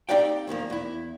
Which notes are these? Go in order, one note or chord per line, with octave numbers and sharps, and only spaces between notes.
C4 D#4 G4 D5 F5 G5
E2 D#3 F3 A#3
E2 E4